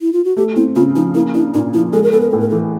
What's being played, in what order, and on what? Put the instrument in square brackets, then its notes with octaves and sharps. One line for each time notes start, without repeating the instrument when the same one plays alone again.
[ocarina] E4
F4
F#4
[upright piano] A3 [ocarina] G4
[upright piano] C4 [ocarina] E4
[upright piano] C#3 [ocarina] F4
[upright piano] F3 [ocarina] D#4
[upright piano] A#3 [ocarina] E4
[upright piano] D4 [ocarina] E4
[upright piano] A#2 [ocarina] D#4
[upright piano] F3 [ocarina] E4
[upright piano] G#3 [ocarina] A4
[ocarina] A#4
[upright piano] B3 [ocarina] A4
[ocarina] A#4
[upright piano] A2 [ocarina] A4
[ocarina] A#4
[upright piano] E3 [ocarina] A4